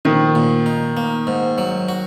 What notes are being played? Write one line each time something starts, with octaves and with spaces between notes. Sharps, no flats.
A#1 D#3
A#2
D#4
A#3
G#2
F#3
F#4